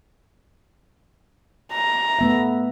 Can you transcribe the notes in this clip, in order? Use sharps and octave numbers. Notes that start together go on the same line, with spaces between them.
A#5
A3 B3 E5